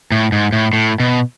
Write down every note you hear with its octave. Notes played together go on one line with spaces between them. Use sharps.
A2
G#2
A2
A2
B2